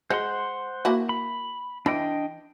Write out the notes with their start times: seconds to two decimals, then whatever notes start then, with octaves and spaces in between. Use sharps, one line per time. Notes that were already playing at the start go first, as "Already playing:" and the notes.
0.10 G#3 C5 F#5 C6
0.85 A#3 E4 F#4
1.09 B5
1.86 E3 D4 D#5 G5